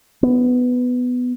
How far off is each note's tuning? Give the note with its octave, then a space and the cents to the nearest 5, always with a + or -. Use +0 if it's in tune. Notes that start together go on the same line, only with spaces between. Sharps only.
B3 +10